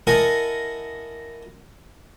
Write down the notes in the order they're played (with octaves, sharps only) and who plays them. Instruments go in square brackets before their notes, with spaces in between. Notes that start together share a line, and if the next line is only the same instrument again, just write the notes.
[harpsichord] E4 A4 A#4 D#5 F#5 G#5